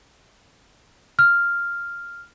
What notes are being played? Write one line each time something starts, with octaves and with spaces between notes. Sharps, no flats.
F6